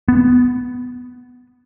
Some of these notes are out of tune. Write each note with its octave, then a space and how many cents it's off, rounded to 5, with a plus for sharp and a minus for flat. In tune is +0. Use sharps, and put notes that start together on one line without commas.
B3 +5